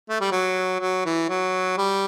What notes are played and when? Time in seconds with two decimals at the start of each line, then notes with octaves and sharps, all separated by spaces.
0.09 A3
0.21 G3
0.32 F#3
0.80 F#3
1.05 E3
1.29 F#3
1.78 G3